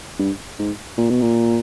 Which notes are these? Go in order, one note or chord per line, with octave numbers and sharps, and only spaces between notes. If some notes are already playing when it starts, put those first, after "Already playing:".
G2
G#2
A#2
B2
A#2